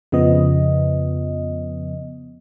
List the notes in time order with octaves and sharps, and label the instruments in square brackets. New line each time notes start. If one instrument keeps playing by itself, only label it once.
[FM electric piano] F2 C#3 F3 B3 D#5